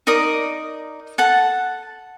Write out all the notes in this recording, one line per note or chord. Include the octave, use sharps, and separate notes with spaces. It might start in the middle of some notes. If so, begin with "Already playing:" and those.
D#4 A#4 D5 D#6
A4 F#5 A5